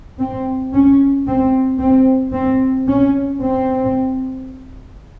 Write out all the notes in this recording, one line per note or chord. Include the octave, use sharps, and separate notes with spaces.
C4
C#4
C4
C4
C4
C#4
C4